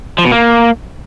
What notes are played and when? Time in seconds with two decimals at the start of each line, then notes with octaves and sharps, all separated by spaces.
0.18 F3
0.25 B2
0.32 A#3